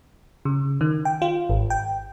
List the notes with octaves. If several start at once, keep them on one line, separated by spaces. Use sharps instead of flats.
C#3
D#3
G5
F4
G#1
G5